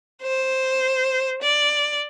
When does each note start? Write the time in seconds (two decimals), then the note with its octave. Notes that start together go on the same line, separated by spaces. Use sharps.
0.22 C5
1.42 D5